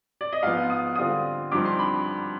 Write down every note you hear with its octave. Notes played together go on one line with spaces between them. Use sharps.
D5
D#5
G#2 F3 B3 F4 F5
D#6
D3 G3 C4 F4 D#6
G2 F3 C4 D#4 D6
C6
B5